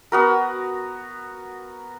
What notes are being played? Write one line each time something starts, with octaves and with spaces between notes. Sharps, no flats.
B3 F#4 A#4